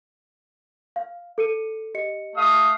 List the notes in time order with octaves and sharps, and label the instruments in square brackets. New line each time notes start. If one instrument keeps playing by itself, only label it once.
[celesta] F5
A4 C#7 D#7
G4 D#5 C#7
[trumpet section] A3 F5 D#6